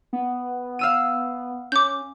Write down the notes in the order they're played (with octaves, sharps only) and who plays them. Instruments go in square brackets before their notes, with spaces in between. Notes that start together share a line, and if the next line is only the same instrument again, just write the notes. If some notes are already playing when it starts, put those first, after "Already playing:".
[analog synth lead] B3
[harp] F5 E6 D#7
[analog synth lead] C#4 [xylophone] D6 G6